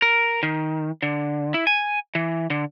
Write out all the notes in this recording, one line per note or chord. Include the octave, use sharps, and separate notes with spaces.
A#4
D#3
D3
E4
G#5
E3
D3